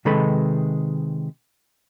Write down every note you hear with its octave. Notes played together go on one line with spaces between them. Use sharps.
C3 D#3 G#3 A4 B4 B5